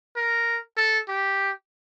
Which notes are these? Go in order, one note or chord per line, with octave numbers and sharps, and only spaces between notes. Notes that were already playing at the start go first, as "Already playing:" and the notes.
A#4
A4
G4